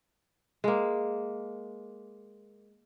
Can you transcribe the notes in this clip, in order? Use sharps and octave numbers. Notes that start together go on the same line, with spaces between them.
G#3 A#3